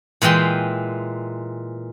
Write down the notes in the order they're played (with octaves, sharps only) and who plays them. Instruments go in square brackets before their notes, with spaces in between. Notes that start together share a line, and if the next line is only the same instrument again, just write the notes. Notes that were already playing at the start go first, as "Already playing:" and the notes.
[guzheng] A#2 E3 G#3 G5 C6